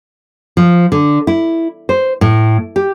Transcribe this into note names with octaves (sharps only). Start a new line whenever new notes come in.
F3
D3
E4
C5
A2
G4